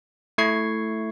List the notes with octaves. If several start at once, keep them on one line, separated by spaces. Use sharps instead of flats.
A3 E4 C#6 G#6 C7